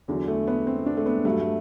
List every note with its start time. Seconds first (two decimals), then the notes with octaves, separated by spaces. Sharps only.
0.08 E2 D3 F#3
0.28 A3
0.47 B3
0.67 C4
0.86 D4
0.97 A3
1.06 B3
1.25 G2 F#3 A3
1.40 A3